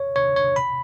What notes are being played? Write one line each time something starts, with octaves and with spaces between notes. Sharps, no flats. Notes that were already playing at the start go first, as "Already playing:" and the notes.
Already playing: C#5
C#5
C#5
B5